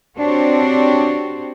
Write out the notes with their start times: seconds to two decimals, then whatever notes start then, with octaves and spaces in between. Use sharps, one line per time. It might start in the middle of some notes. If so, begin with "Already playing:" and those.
0.18 C4 D4 F#4 G4 C5 C#5